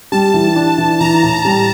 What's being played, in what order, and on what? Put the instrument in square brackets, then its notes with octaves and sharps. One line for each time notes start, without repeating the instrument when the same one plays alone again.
[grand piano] G3 [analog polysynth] A5
[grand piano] E3
D4
E3
[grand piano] E3 [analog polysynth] A#5
[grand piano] A2
G3